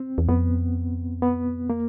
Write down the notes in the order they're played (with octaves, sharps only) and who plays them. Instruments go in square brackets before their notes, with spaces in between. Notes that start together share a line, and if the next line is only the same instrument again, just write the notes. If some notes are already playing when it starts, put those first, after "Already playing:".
Already playing: [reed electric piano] C4
[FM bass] E2
[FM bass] F2 [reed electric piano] B3
[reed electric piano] B3
A#3